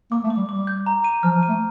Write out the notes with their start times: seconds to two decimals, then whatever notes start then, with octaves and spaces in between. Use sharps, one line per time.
0.11 A#3 D6
0.24 A3
0.30 D6
0.37 G3
0.49 G3 D6
0.67 G6
0.86 A#5
1.04 D#7
1.23 F3 F6
1.36 F3
1.43 D#7
1.49 A3